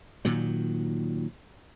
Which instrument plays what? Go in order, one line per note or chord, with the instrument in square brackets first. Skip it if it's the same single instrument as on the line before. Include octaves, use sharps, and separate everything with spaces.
[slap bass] A#2 D#3 F#3